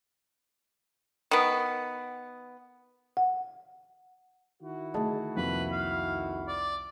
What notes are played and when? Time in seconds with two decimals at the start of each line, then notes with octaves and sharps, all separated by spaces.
1.31 D#3 B3
3.17 F#5
4.62 D#3 E4 F#4
4.94 D3 A3 G#4 D#5 A5
5.36 C2 F2 A#3 B4
5.72 F5
6.48 D5